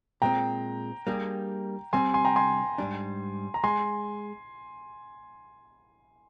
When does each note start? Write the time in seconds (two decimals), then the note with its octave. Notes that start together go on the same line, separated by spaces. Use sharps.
0.22 A#2 G#3 C4 G5 A#5
1.07 G3 A#3 D4 G#4
1.93 C3 G3 C4 G#5 C6
2.14 G#5 C6
2.25 G5 A#5
2.36 G#5 C6
2.78 G#2 G3 D4
3.54 A#5
3.64 G#3 G#5 C6